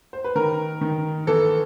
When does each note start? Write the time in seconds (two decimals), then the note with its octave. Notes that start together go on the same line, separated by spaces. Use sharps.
0.13 C5
0.24 B4
0.35 D#3 A#4
0.81 D#3
1.27 E3 A4